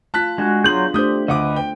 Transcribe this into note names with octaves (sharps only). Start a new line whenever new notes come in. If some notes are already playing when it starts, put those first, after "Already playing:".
A3 F4 A5 F#6 B6
G#3 D4 F4 F#4
F#3 B3 D4 F4 G#4 C6 G6 F#7
A3 D4 G4 C5 D#6 G6
D2 B4 D#5 F#5 D6
G5